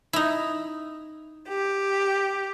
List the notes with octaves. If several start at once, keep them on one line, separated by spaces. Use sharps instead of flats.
D#4 E4
G4